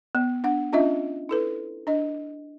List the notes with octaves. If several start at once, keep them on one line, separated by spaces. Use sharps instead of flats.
B3
D4 F#5
C#4 D4 F4 D#5 E5
E4 A4 B4
D4 D#5